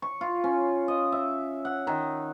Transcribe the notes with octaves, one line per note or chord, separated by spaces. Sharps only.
C#6
F4
C#4
D#5
E5
F#5
D#3